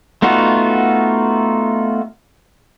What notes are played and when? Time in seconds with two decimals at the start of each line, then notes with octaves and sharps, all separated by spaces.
0.22 A3 B3 D#4 F4 F#4